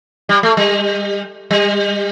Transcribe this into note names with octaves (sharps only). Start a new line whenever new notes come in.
G3
A3
G3
G3